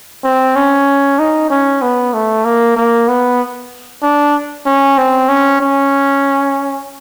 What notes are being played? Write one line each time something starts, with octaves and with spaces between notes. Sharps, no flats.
C4
C#4
D#4
C#4
B3
A3
A#3
A#3
B3
D4
C#4
C4
C#4
C#4